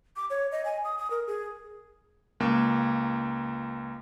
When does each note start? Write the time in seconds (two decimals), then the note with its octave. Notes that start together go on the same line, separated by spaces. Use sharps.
0.16 D6
0.30 C#5
0.52 D#5
0.65 G#5
0.84 D#6
0.98 D#6
1.11 A#4
1.27 G#4
2.40 C#2 A#3